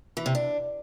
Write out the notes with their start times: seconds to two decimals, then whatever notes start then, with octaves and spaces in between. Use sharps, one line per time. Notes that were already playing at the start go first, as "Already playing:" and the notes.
0.17 E3
0.26 C3
0.35 D4